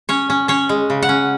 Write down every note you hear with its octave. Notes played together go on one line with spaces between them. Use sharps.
C#4 C#5
C#4
C#4 C#5
G#3
C#3
F#5
C#4